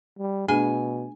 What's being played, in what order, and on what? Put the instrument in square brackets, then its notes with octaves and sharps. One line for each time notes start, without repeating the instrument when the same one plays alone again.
[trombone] G3
[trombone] B2 [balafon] A3 D4 G#4 [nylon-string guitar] G#5